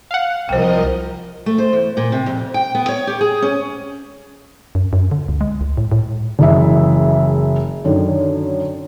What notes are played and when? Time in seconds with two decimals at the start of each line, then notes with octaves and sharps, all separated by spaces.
0.11 F5 F#5
0.49 C2 F3 A#4 C5 D#5 G5
1.46 A3
1.58 C5
1.73 E2
1.97 A#2
2.12 C3
2.26 F2
2.54 G5
2.75 B3
2.89 C#5
3.07 G4
3.21 G#4
3.42 C#4
4.75 F#2
4.93 F#2
5.11 D3
5.28 C#2
5.41 G#3
5.61 C#2
5.77 A2
5.91 A2
6.39 F#1 E3 G#3 G#4 E5
7.84 F#2 D3 D#3